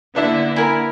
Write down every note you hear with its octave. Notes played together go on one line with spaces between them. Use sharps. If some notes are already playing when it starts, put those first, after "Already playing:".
D3 A#3 B3 D4 E4
E4 A#4 G#5 B5